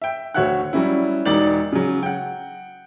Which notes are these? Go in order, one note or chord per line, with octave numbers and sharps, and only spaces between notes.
E5 G5
D2 F#4 C#5 E5 F#5 F#6
F#3 G3 C#4 E4
E1 D#4 D5 A6 F#7
C#3 F#3
F#5 G5